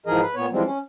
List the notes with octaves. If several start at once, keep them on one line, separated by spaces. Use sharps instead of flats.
G#2 E3 F3 G#4 A#4 D#5
B4
A#2 B3 C#5
E3 F3 G3 G#3 C4
C#4